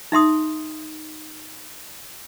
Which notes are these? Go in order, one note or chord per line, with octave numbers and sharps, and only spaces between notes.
D#4 E5 C6 D#6